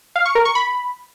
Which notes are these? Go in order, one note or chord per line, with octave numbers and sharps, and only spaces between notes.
F5
C#6
A#4
C#6
B5